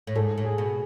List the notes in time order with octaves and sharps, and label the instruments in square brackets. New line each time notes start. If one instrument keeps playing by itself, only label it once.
[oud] A2
[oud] G#2 [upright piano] A4
[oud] A2
[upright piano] G#4
[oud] B2